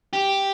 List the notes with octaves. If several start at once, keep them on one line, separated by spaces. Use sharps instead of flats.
G4